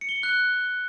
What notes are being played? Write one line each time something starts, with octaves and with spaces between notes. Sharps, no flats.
C#7
G7
C#7
F#6